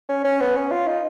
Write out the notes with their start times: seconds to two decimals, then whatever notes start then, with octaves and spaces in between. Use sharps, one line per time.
0.09 C#4
0.24 C#4
0.40 B3
0.56 C#4
0.71 F4
0.87 D#4